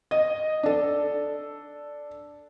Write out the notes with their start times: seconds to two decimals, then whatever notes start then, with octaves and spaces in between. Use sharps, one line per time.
0.11 D#5
0.63 D4 A4